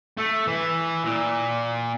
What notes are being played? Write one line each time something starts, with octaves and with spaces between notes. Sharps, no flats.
A3
E3
A#2